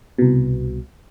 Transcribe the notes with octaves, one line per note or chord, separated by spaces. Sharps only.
C2 B2